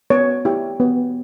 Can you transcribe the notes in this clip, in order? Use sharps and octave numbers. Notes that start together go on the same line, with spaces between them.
B3 C#5
E4 G4
B3